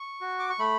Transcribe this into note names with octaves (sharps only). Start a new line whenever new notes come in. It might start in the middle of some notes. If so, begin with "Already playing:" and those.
Already playing: C#6
F#4
D6
C#6
A3 B5